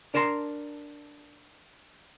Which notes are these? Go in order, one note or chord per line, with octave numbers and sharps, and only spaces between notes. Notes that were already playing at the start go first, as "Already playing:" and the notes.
D4 A#4 A5 A#5 C6